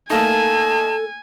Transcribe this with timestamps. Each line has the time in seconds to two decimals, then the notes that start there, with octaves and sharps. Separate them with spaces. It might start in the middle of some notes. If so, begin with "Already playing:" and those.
0.10 A3 A#3 D#4 A4 G#5 A5